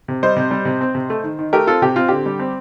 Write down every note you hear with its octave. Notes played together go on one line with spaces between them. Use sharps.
C3
G3 C5 D#5
C3
G3
C3
C4
C3
A3
D#3
D#3
A3 G4 A#4
C4 F4 A4
C3 G4
C4 F4
D3 G4
G3
C4